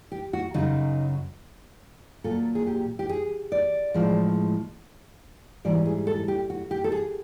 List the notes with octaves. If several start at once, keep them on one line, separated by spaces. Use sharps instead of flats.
G4
F#4
F#2 C#3 F#3 D#4
A#2 F#3 A4
G#4
G4
G4
G#4
D5
A2 F3 G#3
G#2 E3 G3 D5
G#4
A4
G4
F#4
G4
A4
G#4